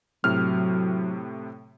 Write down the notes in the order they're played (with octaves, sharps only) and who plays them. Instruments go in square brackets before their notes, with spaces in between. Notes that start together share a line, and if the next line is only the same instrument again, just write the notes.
[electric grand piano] A2 C3 F6 [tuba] F#3